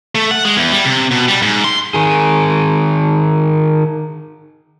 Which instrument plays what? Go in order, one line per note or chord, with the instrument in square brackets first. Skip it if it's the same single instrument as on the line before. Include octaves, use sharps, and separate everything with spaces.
[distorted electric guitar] A3
F#5
G#3
E2
G3
C3
B2
G3
G#2
C6
[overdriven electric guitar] D#3 G#4